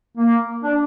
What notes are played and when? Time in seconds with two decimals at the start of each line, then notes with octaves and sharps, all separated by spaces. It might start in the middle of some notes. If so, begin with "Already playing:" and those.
0.17 A#3
0.63 D4